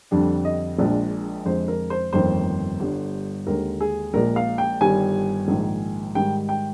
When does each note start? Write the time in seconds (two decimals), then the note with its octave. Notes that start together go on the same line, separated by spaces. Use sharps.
0.11 F2 D3 G3 D4
0.45 D#5
0.78 A#1 A#2 G#3 D4
1.45 F2 D3 G#3 C5
1.68 A#4
1.90 C5
2.13 G1 F2 D#3 A#3 C5
2.80 G1 G2 D3
3.47 D#2 D3 G#3 A#4
3.81 G#4
4.14 A#1 A#2 G#3 A#4
4.36 F5
4.58 G5
4.81 G1 G2 D#3 G3 G#5
5.48 A#1 G#2 D#3
6.15 G#2 D#3 G3 G5
6.49 G5